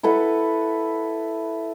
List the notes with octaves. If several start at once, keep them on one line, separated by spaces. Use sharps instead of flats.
E4 A4 B4 F#5